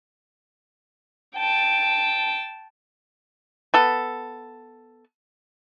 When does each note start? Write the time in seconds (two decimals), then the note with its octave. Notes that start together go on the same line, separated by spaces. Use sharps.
1.38 G5 A5
3.74 B3 A4